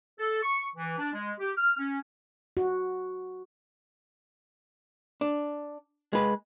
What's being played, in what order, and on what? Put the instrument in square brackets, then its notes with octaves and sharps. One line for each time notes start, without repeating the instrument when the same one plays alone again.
[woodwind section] A4
C#6
E3
D4
G#3
G4
F6
C#4
[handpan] F#4
[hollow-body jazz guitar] D4
G#3 B4